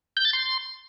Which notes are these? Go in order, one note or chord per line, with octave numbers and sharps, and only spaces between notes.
G6
A6
C6